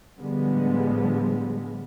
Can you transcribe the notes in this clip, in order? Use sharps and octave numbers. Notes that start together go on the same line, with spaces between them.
A2 D3 F3 G3 G#3 B3